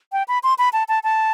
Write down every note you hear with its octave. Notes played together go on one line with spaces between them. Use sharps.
G5
B5
C6
B5
A5
A5
A5